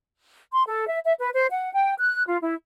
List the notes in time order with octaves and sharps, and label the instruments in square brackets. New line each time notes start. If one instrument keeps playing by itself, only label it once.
[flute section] C6
A4
E5
E5
B4
C5
F#5
G5
F#6
F4
E4